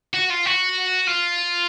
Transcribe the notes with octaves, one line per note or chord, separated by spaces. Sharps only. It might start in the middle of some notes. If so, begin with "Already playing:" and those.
F#4
F4
F#4
F4